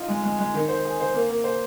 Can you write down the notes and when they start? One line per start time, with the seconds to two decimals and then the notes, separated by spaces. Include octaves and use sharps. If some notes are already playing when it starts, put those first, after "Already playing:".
Already playing: D#4 F4
0.08 G#3
0.24 G#3
0.39 G#3
0.54 D#3
0.69 C5
0.85 G#4
1.00 C5
1.14 A#3
1.29 A#3
1.44 C5